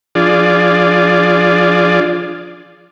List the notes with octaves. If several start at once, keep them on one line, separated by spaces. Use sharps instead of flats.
F3 D4 F4 G#4 D5